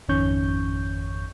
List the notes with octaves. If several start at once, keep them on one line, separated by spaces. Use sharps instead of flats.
G#1 F2 D#3 C#4 C#6 G6